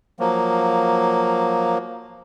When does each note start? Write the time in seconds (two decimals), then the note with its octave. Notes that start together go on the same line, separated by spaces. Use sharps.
0.20 F3 F#3 A#3